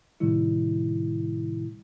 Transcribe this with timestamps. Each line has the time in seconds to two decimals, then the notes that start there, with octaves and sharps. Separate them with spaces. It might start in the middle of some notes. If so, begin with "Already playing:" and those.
0.20 A2 C3 D#3 G3 E4